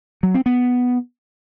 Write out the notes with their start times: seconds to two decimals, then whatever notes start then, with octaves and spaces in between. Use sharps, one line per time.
0.23 F#3
0.34 C4
0.46 B3